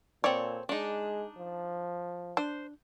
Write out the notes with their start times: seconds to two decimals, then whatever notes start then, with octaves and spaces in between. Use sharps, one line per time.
0.24 A#2 C4 A4 C#5 D5
0.69 G#3 D4 D#4
1.37 F3
2.37 D4 C5